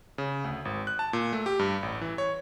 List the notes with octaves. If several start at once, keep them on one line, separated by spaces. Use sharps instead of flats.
C#3
D2
G#1
F#6
A5
A#2
A3
G4
G2
A1
E3
C#5